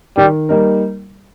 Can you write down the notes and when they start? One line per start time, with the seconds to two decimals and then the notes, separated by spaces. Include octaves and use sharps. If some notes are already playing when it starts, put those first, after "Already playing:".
0.17 D#3 G3
0.49 G3 A#3 D#4 A#4